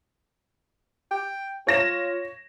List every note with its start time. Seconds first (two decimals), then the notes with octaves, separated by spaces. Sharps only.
1.11 G5
1.67 F4 C#5 A#6 E7